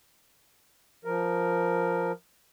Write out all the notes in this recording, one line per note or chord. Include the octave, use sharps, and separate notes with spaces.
F3 A#4